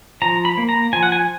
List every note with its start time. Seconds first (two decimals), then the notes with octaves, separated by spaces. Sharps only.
0.22 F3 A#5
0.45 B5
0.57 A#3
0.69 A#5
0.93 F3 G#5
1.03 F#5
1.12 G#5